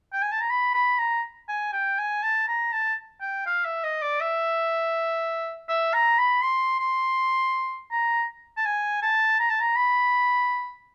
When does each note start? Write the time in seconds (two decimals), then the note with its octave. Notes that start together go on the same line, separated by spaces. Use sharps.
0.13 G5
0.23 G#5
0.32 A5
0.41 A#5
0.50 B5
0.74 B5
0.99 A#5
1.49 G#5
1.73 G5
1.98 G#5
2.23 A5
2.48 A#5
2.72 A5
3.22 G5
3.46 F5
3.65 E5
3.84 D#5
4.02 D5
4.21 E5
5.69 E5
5.94 A#5
6.18 B5
6.42 C6
6.80 C6
7.91 A#5
8.57 A5
8.66 G#5
9.02 A5
9.39 A#5
9.50 A5
9.60 A#5
9.76 B5